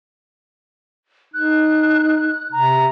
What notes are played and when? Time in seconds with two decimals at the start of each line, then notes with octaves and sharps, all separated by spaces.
1.34 D#4 F#6
2.52 C3 A#5